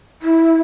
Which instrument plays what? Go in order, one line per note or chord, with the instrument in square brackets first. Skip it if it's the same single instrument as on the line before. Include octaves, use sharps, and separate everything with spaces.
[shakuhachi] E4